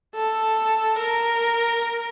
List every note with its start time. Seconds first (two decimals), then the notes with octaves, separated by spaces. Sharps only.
0.15 A4
0.98 A#4